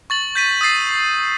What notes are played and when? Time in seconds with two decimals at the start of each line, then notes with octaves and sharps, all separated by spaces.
0.10 C#6 A6 F#7
0.36 G6 B6 D#7
0.61 D#6 E6 A6 C7